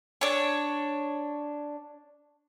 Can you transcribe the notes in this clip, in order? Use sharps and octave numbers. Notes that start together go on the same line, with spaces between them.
D4 C#5